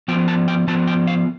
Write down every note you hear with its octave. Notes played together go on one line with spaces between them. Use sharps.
F3 B3 F4 G5
A5
G5
F3 B3 F4 A5
G5
F5